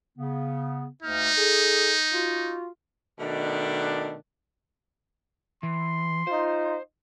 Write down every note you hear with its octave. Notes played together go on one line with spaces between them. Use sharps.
C#3 B3
D2 A#3 D#4 F6
G#4 A4
F4 F#4
B2 D#3 A3 D4
E3 C6
D#4 F4 C5